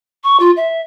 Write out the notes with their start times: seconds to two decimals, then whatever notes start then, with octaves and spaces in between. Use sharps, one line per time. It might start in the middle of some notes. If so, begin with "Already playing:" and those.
0.24 C#6
0.39 F4
0.56 E5